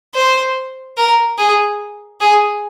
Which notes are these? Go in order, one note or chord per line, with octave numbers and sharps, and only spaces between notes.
C5
A#4
G#4
G#4